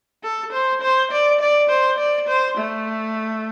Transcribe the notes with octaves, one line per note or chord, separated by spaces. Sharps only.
A4
C5
C5
D5
D5
C5
D5
C5
A3